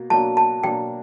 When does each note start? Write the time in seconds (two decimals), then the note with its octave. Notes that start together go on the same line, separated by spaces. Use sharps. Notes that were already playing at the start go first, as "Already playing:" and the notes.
Already playing: B2 A#3
0.10 B2 F#3 A#3 D4 A5
0.37 A5
0.63 B2 F#3 A#3 D4 G5